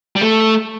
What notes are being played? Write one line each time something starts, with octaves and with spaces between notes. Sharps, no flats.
G3
A3